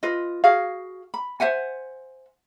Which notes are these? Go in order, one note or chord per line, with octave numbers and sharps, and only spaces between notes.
F4 B4 D#5
F#4 G#4 F5
B5
C5 E5 F#5 G#5